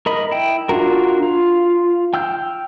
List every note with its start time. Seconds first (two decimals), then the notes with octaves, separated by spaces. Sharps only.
0.06 A#4 D#5 B5
0.31 E4 G5
0.69 D4 F4 F#4 A#4
1.22 F4
2.14 G5 E6 F6 G6